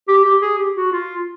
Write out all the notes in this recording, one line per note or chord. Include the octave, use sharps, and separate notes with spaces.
G4
G4
G#4
G4
F#4
F4